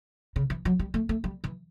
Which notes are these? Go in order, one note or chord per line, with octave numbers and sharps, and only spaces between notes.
C#3
E3
F#3
G3
A3
A3
G3
E3